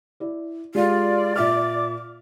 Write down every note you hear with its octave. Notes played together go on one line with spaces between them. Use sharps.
E4 D5
G#3 F4 G4 D5
A#2 E5 D6 F6